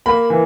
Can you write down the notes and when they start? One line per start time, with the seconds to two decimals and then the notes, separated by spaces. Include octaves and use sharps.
0.06 A#3 B5
0.30 E3